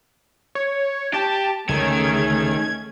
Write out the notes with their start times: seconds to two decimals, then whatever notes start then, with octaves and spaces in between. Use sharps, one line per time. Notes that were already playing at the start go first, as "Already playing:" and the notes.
0.55 C#5
1.14 G4 A5
1.69 C#2 D3 D#3 G#3 A3 C#4 G#4 G#6